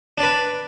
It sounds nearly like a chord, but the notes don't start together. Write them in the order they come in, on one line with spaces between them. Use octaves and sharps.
D4 D5 B4